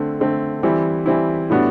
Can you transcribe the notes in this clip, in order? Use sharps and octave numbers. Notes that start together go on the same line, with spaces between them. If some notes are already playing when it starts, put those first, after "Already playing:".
Already playing: D3 A3 C4
D3 A3 C4
E3 G3 C4 E4
E3 G3 C4 E4
A2 G3 B3 D4 F#4